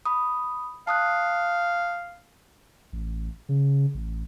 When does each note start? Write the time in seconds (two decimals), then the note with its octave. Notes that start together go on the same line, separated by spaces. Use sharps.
0.05 B5 D#6
0.87 F5 A5 D#6 F#6
2.93 A1
3.49 C#3
3.94 A1